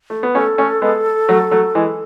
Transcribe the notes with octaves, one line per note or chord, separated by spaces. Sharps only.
A3
B3
A3 C#4 A4
A3 C#4
G#3 B3
F#3 A3
F#3 A3
E3 G#3